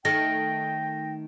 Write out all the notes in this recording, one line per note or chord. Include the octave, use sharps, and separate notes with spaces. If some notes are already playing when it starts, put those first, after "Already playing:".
D#3 A3 G5 A#6